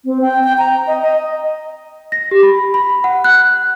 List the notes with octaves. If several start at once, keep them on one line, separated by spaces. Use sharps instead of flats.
C4
G5
G5
A#5
D#5
D#5
A#6
G4
B5
B5
F#5
F#6